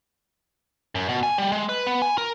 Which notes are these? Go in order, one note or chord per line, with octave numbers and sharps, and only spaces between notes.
F#2
B2
G#5
G3
G#3
B4
B3
G#5
A#4